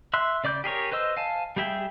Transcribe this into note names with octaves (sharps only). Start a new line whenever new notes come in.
E5 C6 E6 F#6
C#3 D5 D6 G6
G4 G#4 A#4 C#5
B4 C5 D#5 E6
F5 G#5 A5
G3 G4 G#4 E5 G5